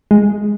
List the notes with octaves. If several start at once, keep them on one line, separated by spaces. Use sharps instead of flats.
G#3